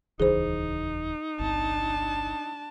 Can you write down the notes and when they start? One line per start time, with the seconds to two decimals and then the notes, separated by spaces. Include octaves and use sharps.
0.20 D#1 C#2 E3 D#4 G#4 C5
1.40 G1 C2 C3 D4 A5